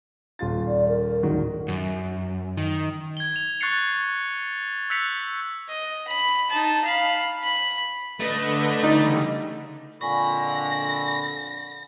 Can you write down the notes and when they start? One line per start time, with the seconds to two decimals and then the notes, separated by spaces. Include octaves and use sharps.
0.39 D#1 F4 A6
0.68 D5
0.88 A#4
1.23 D1 D#3 F#4
1.68 F#2
2.57 D#3
3.17 G#6 G7
3.36 F7
3.60 C#6 F#6 A6 C7 C#7 F7
4.90 E6 F#6 G6 B6 C#7 F7
5.69 D#5
6.08 B5
6.50 D#4 A5
6.84 F5 B5
7.44 B5
8.20 D3 A3 B4 D#5
8.83 C#3 E3 G3 D#4
10.01 F2 A#2 D3 G#5 B5 C#6 A#6